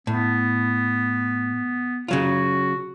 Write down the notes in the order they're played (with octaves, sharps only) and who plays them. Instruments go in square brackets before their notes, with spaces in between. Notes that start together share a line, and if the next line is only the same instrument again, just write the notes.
[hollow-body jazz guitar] A2 [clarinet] B3
[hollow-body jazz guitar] C#3 F#3 F4 [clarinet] F#4